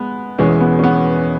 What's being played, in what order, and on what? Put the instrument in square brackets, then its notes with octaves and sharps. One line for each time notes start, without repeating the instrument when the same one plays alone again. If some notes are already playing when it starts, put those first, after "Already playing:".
Already playing: [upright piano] G#3 B3
[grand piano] E1 E2 E3 G#3 [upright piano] C#4
[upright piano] B3
C#4
B3